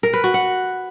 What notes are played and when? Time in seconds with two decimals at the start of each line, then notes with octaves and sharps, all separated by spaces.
0.03 A#4
0.13 B4
0.24 F#4
0.34 F#5